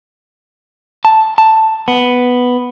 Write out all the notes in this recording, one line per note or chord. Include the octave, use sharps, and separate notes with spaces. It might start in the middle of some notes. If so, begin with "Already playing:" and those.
A5
A5
B3